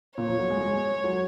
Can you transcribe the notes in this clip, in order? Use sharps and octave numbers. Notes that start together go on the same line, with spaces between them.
A#2 C#5
F3
F#3
G#3
G#3
F#3